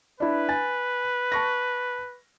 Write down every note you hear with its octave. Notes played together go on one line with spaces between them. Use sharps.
D4 E4 B4
G#5 A6
A5 C#6 A#6